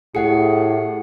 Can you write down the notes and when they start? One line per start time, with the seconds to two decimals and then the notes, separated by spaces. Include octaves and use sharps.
0.15 A2 G4 G#4 F#5 C#7